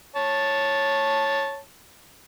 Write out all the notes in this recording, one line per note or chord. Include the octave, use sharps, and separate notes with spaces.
C#5 A5